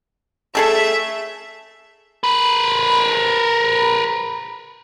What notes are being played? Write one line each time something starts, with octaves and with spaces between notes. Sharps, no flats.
A3 G#4 A4 E5
A#4 B4